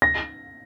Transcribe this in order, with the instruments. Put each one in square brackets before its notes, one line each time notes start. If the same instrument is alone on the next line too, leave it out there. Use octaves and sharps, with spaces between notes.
[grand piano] A#6